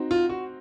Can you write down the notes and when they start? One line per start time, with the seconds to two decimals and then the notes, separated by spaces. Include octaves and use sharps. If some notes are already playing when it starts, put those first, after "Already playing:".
Already playing: C4 D#4 F#4
0.11 F4
0.30 F#4